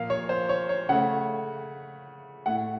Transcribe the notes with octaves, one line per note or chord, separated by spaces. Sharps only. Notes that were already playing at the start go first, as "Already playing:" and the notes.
Already playing: A#2 F3 A#3 F5
C#5
C5
C#5
C#5
C#3 A3 F#5
A2 A3 F#5